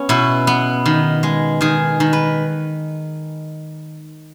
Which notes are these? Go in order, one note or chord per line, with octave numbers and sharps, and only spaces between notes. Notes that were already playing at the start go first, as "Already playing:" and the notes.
Already playing: B3 C#4
B2 E4
B3
D#3
G#3
D#3 G#4
D#3
B4